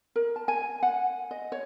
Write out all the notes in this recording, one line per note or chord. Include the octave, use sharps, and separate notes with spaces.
A#4
A5
G#5
F#5
D#5
C#5